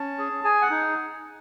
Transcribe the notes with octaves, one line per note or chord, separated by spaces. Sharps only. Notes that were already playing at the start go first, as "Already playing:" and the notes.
Already playing: C#4 A5
G#4
G#4 G#5
F#5
D#4